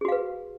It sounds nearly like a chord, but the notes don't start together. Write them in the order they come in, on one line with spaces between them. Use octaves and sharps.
G#4 F#4 F5 B4